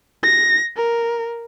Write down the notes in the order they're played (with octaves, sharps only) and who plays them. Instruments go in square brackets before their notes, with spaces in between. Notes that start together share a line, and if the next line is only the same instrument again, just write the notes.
[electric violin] A#6
A#4